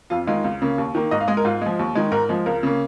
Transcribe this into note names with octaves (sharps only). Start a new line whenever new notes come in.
F2 F4
D#3 G#3 F4
C#2
C#3 A#3
D#2
D#3 A#3
G#2 D#5
F5
G#3 D#5
A#4
G#2 F4
F3 G#3
D#2
D#3 G#3
G#2 A#4
F3 G#3
C#2 A#4
C#3 A#3